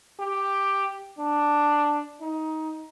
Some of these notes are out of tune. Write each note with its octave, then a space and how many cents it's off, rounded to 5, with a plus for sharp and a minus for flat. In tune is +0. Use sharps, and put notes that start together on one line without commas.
G4 +5
D4 +5
D#4 +15